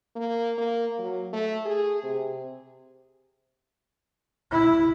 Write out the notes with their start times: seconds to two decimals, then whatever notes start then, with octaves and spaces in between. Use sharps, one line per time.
0.16 A#3
0.58 A#3
0.98 F#3
1.33 A3
1.65 G#4
2.03 C3
4.51 E4